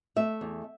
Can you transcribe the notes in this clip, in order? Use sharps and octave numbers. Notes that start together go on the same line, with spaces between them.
A3 E5
E2